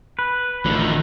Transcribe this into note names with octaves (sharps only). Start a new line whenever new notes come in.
B4
A1 D2 A2 D3 D#3 F3